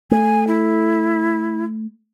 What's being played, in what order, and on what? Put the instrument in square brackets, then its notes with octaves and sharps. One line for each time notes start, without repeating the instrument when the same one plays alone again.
[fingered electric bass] A3 [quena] G#5
[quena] E4